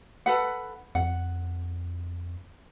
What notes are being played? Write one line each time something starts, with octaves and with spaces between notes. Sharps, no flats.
A4 B4 F#5
F2 F#5